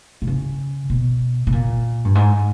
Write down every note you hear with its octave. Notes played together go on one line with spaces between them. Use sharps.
B2
C#3
B2
B2
A#2
G2
G#2